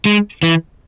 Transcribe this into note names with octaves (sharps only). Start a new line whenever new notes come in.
G#3
E3